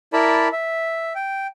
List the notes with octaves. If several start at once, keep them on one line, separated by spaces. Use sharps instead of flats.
E4 A#4 D5 A5 B5
E5
G5